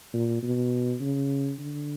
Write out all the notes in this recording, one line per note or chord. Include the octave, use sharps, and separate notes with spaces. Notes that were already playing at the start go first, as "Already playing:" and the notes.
A#2
B2
C#3
D3